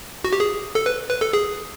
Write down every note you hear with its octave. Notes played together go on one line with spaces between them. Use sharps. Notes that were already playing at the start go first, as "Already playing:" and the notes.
F#4
G4
G#4
A4
B4
B4
A4
G#4